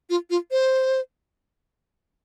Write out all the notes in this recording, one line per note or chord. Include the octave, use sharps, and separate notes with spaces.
F4
F4
C5